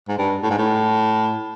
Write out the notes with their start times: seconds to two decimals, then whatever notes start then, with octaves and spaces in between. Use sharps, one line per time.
0.08 G#2
0.18 G2
0.43 A2
0.50 G#2
0.58 A2